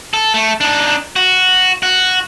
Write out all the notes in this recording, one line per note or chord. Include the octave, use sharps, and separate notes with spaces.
A4
A3
D4 D#4
F#4
F#4